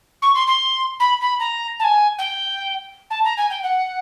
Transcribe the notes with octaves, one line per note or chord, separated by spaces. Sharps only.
C#6
C6
C6
B5
B5
A#5
A5
G#5
G5
A5
A#5
G#5
G5
F#5